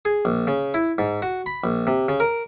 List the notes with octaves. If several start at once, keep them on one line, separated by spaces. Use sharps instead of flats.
G#4
A#1
C#3
E4
G#2
F#4
B5
A#1
C3
C#3
A#4